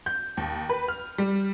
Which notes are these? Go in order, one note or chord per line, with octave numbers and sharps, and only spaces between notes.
G6
D#2
B4
F6
G3